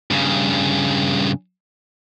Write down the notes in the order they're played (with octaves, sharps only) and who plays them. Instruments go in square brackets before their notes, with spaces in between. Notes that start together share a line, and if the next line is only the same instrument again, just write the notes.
[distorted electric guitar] G2 C#3